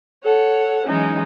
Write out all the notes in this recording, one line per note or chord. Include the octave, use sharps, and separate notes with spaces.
A4 C#5 F#5
E3 F#3 G#3 C#4 D#4